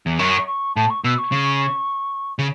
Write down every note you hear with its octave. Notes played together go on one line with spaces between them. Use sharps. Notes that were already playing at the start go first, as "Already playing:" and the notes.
E2
F#2 C#6
C#6
A2 A5
C#6
B2 E6
C#6
C#3
C#3